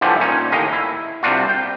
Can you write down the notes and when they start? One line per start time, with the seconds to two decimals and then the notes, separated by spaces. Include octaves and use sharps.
0.01 A2 D3 E3 F3 G3 A3
0.20 A#2 C#4 D#4
0.52 D#2 A2 D#5 F5
0.73 E4
1.23 C2 C3 G3 D4 F4 F#4
1.49 G5